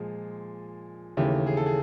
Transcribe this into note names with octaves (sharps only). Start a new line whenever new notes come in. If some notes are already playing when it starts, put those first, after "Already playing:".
Already playing: A#2 F3 G#3 G#4
D#2 C#3 E3 A3 G4
G#4
A4
G#4